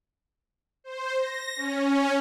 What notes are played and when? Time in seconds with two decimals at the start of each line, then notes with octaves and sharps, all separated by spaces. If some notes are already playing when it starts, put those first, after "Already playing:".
0.84 C5
1.18 A#6
1.56 C#4